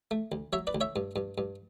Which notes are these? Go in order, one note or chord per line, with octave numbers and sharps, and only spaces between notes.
A3
D2
F#3 C#5 E5
B4 D5
D2
C#5 E5
G2
G2
G2